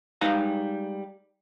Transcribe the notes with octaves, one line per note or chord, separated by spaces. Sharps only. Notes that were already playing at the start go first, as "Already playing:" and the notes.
G3 G#3 D#4 B4 F5 A#5